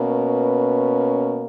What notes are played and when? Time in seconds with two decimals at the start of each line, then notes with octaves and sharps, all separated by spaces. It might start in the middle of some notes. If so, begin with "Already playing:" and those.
Already playing: B2 A#3 C#4
0.11 B4